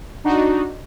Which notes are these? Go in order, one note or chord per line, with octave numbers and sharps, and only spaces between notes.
D4 D#4 F#4